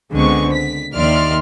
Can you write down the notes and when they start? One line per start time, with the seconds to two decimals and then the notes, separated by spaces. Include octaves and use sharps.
0.13 C#2 D3 G#3 B3 C4 C#6
0.53 B6
0.95 D#2 D#3 D5 E5 C6 F6